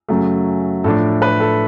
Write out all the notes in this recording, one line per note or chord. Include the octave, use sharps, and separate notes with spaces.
F#2 C#3 F#3 A3
A2 F3 A3 D4 A4
B4
A4